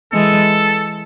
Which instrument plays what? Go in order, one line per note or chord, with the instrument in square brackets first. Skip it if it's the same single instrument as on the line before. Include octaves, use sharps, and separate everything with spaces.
[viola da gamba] E3 G#3 [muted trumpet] A4